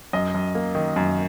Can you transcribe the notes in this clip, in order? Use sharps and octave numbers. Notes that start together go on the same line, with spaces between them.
F#2 D#5
F#2
A#3
D#3
F#2